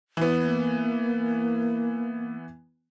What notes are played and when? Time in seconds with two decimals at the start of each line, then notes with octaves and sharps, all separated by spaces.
0.17 E3 B3
0.42 A#3